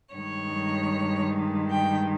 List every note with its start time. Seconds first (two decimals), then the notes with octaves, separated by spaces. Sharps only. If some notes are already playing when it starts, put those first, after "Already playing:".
0.14 G2 D#3 G#3 C#5
1.69 G5